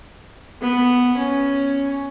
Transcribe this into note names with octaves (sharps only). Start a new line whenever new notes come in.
B3
C#4